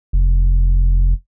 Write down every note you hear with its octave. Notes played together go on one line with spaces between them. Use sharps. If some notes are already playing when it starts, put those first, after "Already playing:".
F1